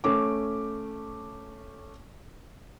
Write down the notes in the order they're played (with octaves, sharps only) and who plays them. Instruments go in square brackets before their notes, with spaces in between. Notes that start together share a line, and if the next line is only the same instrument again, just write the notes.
[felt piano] A3 C#4 D6